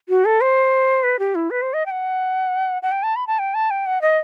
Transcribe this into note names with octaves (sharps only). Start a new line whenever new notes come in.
F#4
A4
C5
B4
G4
E4
B4
C5
D#5
G5
F#5
F#5
G5
A5
B5
A5
G5
A5
G5
F#5
D#5